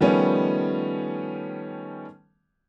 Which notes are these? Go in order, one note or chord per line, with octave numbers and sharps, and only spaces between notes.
D#3 F3 G3 A3 B3 C#4